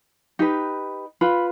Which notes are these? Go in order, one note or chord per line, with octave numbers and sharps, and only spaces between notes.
D#4 G4 B4
F4 B4 B5